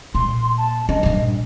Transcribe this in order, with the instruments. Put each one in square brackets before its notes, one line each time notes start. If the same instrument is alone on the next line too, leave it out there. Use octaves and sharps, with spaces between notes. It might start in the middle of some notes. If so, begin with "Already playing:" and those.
[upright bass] A#2 [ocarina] C6
[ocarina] A5
[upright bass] C#4 [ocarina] D#5
[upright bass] A#1 G2